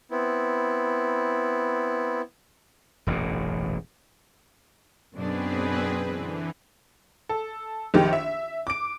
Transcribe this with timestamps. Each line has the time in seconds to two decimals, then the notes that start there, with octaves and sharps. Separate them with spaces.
0.11 B3 C4 E4
3.07 E1 A1 F#2 A#2
5.14 F#2 B2 C4 D4 G#4 B4
6.00 D3 E3
7.29 A4
7.94 A#1 D#3 G4
8.13 E5
8.67 D6 D7